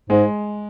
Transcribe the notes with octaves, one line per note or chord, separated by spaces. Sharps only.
G#2 G#3